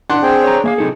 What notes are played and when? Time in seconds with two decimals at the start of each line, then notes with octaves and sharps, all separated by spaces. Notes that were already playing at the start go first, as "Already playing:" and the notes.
0.10 D4 F#5 C6
0.22 C4 G#4 G5
0.44 C#5 A#5
0.64 A#3 G#4 E5 F5
0.78 C4 D#4 A4